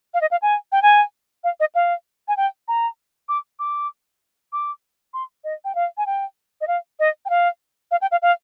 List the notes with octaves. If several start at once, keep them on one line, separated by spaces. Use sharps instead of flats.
F5
D#5
F5
G#5
G5
G#5
F5
D#5
F5
G#5
G5
A#5
D6
D6
D6
C6
D#5
G5
F5
G#5
G5
D#5
F5
D#5
G5
F5
F5
G5
F5
F5